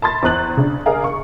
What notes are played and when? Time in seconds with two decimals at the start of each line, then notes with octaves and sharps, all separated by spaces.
0.02 A5 B5 C6 A6
0.23 E2 C5 F#6 F#7
0.57 C#3 D4
0.86 G#4 A#4 D5 F5 G#5 A#5
1.04 C#6